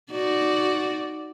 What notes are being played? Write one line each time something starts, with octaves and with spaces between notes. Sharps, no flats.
D#4 F#4 D5